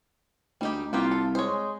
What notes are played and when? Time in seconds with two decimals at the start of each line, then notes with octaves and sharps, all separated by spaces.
0.61 D2 G3 D#4 G4
0.93 C2 A#3 B3 F4 G4
1.11 A4
1.35 G#3 C5 C#5